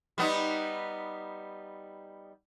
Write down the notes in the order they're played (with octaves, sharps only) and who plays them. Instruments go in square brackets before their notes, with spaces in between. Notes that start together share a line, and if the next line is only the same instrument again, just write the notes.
[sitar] G3 B3 D#4